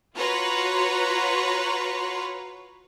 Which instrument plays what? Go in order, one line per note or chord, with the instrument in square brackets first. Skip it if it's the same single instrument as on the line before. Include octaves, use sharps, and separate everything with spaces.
[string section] F4 F#4 B4 C#5 A#5 C6